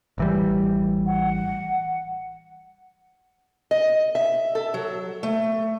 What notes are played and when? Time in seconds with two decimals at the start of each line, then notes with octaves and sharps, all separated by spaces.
0.18 A1 E3 G3
1.07 F#5
3.71 D#5
4.15 E5
4.55 A4
4.74 F#3
5.23 A3